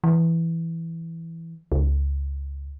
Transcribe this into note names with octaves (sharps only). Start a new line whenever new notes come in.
E3
C#2